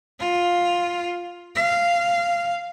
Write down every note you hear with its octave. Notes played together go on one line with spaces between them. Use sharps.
F4
F5